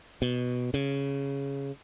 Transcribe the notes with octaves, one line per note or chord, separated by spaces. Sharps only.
B2
C#3